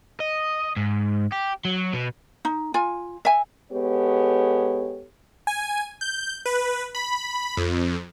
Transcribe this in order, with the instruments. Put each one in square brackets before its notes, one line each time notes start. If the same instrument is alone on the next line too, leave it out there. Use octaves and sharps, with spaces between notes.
[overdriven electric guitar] D#5
G#2
G4
F#3
B2
[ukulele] D#4
F4 G#5
E5 G#5
[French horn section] G#3 B3 G4 A4 C#5
[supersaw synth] G#5
G6
B4
B5
F2